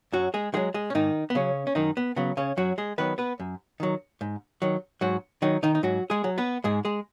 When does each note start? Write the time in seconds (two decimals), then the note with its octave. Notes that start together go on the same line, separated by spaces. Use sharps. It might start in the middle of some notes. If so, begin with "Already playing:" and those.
0.13 F#2 F#3 F#4
0.34 G#3 G#4
0.54 D#3 F#3 G#3 G#4
0.74 G#3 G#4
0.90 C#4
0.95 G#2 D#3 D#4
1.30 B3
1.35 C#3 F#3 C#4
1.67 C#4
1.75 F#2 D#3 D#4
1.97 B3
2.16 C#3 F#3 B3
2.37 C#3 C#4
2.57 F#2 F#3 F#4
2.78 G#3 G#4
2.98 D#3 F#3 B3 B4
3.18 B3 B4
3.40 F#2
3.80 D#3 F#3
4.21 G#2
4.62 D#3 F#3
5.01 G#2 F#3 F#4
5.42 D#3 F#3 D#4
5.63 D#3 D#4
5.75 D#4
5.83 G#2 F#3 F#4
6.10 G#3 G#4
6.24 F#3
6.38 B3 B4
6.64 G#2 G#3 G#4
6.85 G#3 G#4